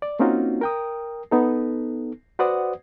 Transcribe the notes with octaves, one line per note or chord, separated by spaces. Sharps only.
D5
A#3 C4 C#4 D#4 F4 F#4
A#4 G5 D#6
B3 D#4 A4
F#4 B4 C5 D5 F#5 D#6